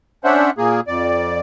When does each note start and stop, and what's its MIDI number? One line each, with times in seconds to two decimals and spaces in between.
0.24 0.51 61
0.24 0.51 62
0.24 0.51 72
0.24 0.51 76
0.24 0.51 78
0.58 0.80 46
0.58 0.80 58
0.58 0.80 68
0.87 1.40 41
0.87 1.40 74